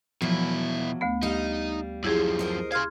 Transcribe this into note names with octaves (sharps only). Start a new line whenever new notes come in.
E2 B2 F3 F#3 E4
D2 A3 B3
G3 D#4 F5
F#2 F3 E4 G4 G#4
A#4 C5 D#5
G#4 F5 C6 F6 G#6